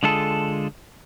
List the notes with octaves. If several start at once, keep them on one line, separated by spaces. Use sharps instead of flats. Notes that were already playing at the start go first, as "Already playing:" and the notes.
D3 G#3 F4 G#4 A4